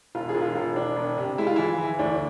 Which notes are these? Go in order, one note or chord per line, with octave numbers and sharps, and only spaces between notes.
E1 F4
G#4
E1
F4
E1
E1 D4
E1
C3
G#3 E4
F4
E3 E4
E3
D2 D4